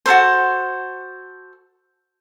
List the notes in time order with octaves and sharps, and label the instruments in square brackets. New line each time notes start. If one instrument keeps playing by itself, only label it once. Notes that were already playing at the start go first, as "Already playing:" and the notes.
[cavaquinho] F#4 G#4 A4 C5